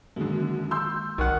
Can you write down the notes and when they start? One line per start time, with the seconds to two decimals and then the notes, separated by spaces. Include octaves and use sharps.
0.16 F#2 D3 D#3 G#3 A#3
0.71 C6 E6 G6
1.18 B1 D#3 F#5 C#6